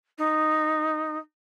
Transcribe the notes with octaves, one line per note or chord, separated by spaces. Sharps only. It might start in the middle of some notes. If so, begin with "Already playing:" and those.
D#4